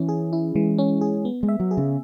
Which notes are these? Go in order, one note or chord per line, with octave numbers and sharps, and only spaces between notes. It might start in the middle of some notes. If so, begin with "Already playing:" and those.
Already playing: E3 C#4
G#4
E4
E3 G#3
C#4
G#4
B3
G#3
E5
F#3
G#4
C#3